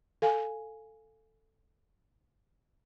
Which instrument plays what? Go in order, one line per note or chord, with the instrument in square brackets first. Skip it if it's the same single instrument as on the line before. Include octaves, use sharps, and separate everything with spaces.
[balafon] A4 F5 G#5